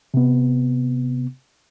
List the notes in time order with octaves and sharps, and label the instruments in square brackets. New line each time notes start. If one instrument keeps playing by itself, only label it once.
[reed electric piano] C3 B3